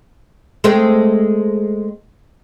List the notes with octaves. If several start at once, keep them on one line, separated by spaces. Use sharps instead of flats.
G#3 A3 C4